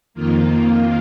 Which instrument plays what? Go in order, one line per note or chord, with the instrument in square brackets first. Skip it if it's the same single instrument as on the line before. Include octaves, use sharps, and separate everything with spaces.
[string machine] F2 D#3 A#3 F4